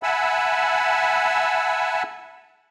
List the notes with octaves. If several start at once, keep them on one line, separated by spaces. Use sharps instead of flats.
E5 F#5 G#5 A5 B5 E6